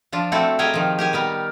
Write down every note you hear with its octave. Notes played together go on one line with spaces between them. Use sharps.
F3 D4 F4
A3 C4 E4 F#4 A4
G4 G#4 A#4 D#5 G5 G#5
D#3 F3
G4 A#4 G#5
G3 B3 A#4